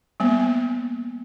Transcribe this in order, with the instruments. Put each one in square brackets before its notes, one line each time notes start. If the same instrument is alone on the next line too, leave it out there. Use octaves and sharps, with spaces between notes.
[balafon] G3 A#3 B3